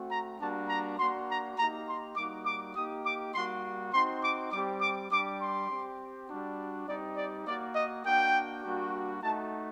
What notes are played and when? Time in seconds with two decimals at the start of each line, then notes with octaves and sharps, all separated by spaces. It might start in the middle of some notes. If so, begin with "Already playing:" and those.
Already playing: A3 C4 F#4
0.11 A#5
0.40 G3 A#3 D4 F#4 A5
0.69 A#5
0.99 A#3 D4 F#4 C6
1.29 A#5
1.57 A#3 D#4 G4 A#5
1.87 C6
2.16 G3 A#3 D#4 F#4 D6
2.46 D6
2.75 A#3 D#4 G4 D#6
3.05 D6
3.34 G3 A#3 F#4 C6
3.93 C4 D#4 F#4 C6
4.22 D6
4.52 G3 C4 G4 D6
4.81 D6
5.10 G3 D4 G4 D6
5.40 C6
5.70 C4 G4
6.28 G3 D4 F#4
6.86 G3 C4 D#4 G4 D5
7.17 D5
7.46 A#3 D5
7.50 F#4
7.75 D#5
8.04 A#3 D4 F#4 G5
8.63 G3 A#3 D4 F#4
9.21 A3 D#4 F#4 A5